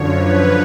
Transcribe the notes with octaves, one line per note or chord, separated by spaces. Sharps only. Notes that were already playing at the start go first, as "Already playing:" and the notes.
Already playing: F#2 D3 F3 C#5
B4